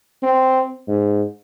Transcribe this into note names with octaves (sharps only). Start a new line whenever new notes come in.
C4
G#2